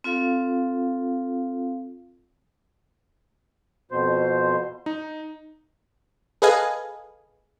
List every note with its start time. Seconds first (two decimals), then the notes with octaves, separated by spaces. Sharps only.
0.04 C4 F4 A4 F5
3.91 F2 B2 C5
4.86 D#4
6.42 G#4 A4 B4 D#5 F5 G#5